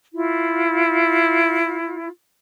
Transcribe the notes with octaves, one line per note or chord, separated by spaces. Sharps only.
E4 F4